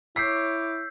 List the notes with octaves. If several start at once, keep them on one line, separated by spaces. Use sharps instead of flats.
E4 C#5 D6 E6 G6 B6 C7